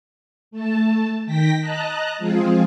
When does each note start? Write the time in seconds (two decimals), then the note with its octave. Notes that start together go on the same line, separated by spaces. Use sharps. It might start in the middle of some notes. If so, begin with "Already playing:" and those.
0.51 A3 A5
1.26 D#3 G5 A#6 B6
1.60 D#5 A5 A#5 F#6
2.18 F3 G#3 C4 F4 G#4